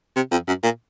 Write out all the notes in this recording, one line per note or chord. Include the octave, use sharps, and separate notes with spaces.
C3
F2
F#2
A#2